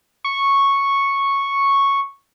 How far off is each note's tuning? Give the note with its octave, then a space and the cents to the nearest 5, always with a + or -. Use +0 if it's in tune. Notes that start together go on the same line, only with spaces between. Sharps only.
C#6 -5